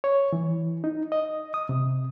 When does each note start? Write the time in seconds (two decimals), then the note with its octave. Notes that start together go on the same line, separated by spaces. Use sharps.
0.04 C#5
0.33 E3
0.84 D#4
1.12 D#5
1.54 D#6
1.69 C3